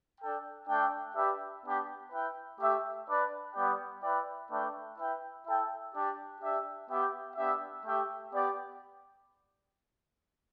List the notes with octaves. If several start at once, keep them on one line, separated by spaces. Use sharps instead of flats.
D4 A4 G5
A3 D4 A4 G5
D4 G4 B4 E5
B3 D4 G4
E4 B4 G5
A3 G4 E5
D4 B4 D5
G3 B3 G4 D5 G5
E4 B4 D5 G5
A3 D4 B4 D5 G5
E4 B4 G5
E4 A4 G5
D4 G4 D5
D4 G4 E5
B3 G4 E5 G5
B3 D4 G4 E5
A3 G4 E5 G5
B3 G4 D5